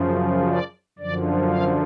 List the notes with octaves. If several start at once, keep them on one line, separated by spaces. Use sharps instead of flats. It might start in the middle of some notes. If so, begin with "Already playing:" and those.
Already playing: F#2 C#3 F3
D5
F#2 D3 F3 D5
F5